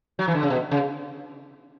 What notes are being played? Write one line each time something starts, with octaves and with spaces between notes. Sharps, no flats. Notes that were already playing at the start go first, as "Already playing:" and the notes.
F#3
E3
D3
C#3
B2
C#3